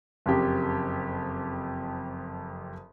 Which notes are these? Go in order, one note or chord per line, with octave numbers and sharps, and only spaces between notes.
F#1 F2 G4